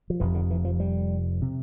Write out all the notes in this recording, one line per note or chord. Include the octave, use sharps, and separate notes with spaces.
F3
F1 F2 C3 E3
D3
E3
F3
G3
C3